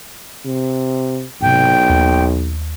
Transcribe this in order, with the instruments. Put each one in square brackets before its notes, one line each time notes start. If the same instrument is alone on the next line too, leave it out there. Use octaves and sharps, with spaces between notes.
[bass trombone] C3
[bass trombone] B1 [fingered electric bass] G#2 C3 [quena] G5
[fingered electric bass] D#2 A#3